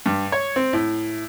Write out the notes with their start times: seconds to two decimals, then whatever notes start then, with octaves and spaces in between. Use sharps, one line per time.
0.06 G2
0.32 C#5
0.56 C4
0.73 A2